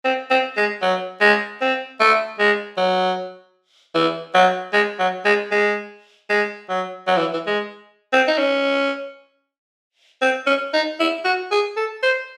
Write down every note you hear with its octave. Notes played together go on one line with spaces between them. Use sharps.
C4
C4
G#3
F#3
G#3
C4
A3
G#3
F#3
E3
F#3
G#3
F#3
G#3
G#3
G#3
F#3
F#3
E3
E3
G#3
C4
D#4
C#4
C4
C#4
D#4
E4
F#4
G#4
A4
C5